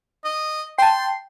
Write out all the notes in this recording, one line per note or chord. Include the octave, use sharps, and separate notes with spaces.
D#5
G5 A5 C6